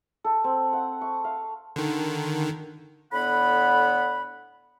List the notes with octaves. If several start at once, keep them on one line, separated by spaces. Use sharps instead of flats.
A4
C4
F#5
C#6
F5
D3 D#3
A2 D3 B3 F#5 B5